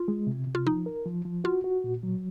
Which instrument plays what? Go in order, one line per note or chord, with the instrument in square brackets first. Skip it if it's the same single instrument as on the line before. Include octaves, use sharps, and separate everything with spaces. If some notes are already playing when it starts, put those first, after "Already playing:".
Already playing: [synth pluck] F4
[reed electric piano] G#3
C3
C3
[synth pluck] F4
[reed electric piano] F3 [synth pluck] D#4
[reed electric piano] A#4
F3
F3
[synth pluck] F4 [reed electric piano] F#4
[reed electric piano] F#4
A#2
F#3